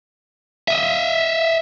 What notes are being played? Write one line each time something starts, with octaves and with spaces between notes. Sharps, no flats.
D#5 E5